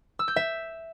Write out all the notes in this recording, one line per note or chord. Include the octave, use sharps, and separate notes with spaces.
E6
G6
E5